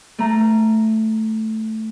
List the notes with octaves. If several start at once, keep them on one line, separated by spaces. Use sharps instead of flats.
A3 A#5